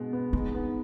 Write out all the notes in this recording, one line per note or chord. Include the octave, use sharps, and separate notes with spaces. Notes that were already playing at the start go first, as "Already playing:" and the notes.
Already playing: B2 G#3 B3
B3
G#3 D#4
B3